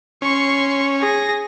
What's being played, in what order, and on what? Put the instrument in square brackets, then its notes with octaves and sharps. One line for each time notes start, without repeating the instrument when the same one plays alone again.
[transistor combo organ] C#4 [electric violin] C6 C#6
[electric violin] G#4 A#6